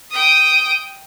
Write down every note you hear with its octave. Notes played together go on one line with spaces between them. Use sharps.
G5 D#6